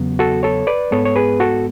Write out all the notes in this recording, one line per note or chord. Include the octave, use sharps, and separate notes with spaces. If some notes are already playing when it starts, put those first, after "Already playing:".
Already playing: E2 C#3 F#3 B3
F#4 A4
A4 C#5
B4 D5
G#2 G#3 B3 A4 C#5
C#5
G#4 B4
F#4 A4